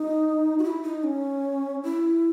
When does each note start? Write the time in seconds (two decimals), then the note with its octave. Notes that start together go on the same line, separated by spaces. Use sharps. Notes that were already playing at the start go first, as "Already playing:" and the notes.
Already playing: D#4
0.59 F#4
0.64 E4
0.83 D#4
1.04 C#4
1.83 E4